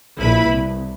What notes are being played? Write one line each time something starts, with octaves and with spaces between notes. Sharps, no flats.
A#1 E4 B4 B5
C2